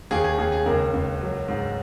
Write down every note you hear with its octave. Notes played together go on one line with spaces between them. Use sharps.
D#2 G#4
G#4
D#2 G#4
G#4
C#2 A#4
C#2
F#3
G#2